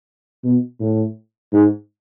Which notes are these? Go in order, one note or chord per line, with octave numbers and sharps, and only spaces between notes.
B2
A2
G#2